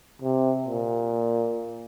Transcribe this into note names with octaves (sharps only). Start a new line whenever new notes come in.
C3
A#2